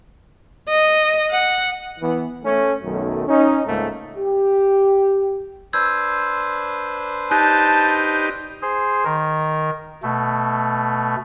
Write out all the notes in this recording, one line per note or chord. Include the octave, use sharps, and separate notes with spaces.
D#5
F#5
E3 B3
A3 C#4
B1 F#2 D#3 A3
C#4 D#4
C#2 G#2 A3 A#3
G4
D4 B4 C5 E6 G6 G#6
D#4 G4 A5 F#6
G#4 C5
D#3 A#4
B2 A3